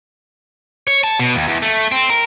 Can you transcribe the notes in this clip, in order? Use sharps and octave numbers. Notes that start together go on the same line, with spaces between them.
C#5
A5
B2
D#2
E2
A3
C4
A#4